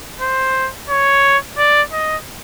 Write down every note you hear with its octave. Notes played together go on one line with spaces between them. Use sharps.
C5
C#5
D5
D#5